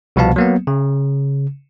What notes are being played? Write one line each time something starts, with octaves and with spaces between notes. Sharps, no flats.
C2 B2 F3 B3 F5 A5
F#3 A#3 B3
C#3